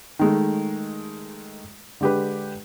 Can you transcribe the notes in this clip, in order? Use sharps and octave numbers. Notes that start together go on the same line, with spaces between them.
D#3 G#3 A3
D3 G#3 G4 G#4 B4